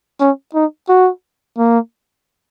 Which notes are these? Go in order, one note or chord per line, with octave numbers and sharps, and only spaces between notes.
C#4
D#4
F#4
A#3